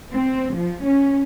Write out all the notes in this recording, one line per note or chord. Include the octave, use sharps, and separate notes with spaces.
C4
F3
C#4